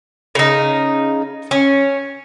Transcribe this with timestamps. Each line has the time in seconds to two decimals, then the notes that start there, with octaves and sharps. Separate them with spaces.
0.35 C#3 D#4
1.51 C#4